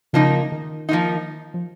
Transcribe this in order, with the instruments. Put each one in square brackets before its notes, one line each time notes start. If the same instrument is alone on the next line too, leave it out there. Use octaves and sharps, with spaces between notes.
[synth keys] C#3 [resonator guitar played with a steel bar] F3 A#3 D#4
[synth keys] D#3
[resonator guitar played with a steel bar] F3 A#3 D#4
[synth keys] F3